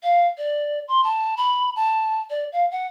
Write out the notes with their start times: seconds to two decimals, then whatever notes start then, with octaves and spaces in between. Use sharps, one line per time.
0.03 F5
0.38 D5
0.88 C6
1.04 A5
1.37 B5
1.76 A5
2.30 D5
2.52 F5
2.71 F#5